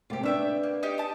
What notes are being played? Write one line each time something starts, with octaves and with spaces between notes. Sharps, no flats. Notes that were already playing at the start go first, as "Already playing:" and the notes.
C3 A#3 C4 F4 G4
A3 B3 D4 E5 G5
A#3
D#4 G4
A5 D#6